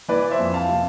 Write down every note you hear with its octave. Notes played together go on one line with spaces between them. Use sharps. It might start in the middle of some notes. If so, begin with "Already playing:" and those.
E3 B4 D5
C5 E5
F2
F5 A5
C3